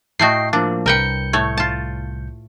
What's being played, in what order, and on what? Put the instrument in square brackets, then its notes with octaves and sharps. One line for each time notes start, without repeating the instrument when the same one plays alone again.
[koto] A2 A3 F#4 [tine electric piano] D#5 G5 C7
[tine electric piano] F3 A#3 [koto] D4
[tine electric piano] C2 G6 C#7 [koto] A#4 B4 G5
[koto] A2 A3 C#5
F4 A5